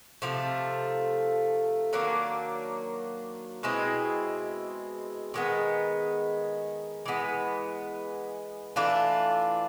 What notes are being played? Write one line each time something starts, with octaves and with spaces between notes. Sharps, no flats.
C3 F3 A3
D#3 F#3 A#3 D4
B2 G#3 C4 E4
D#3 G#3 B3
E3 G#3 B3
E3 A3 D4 F4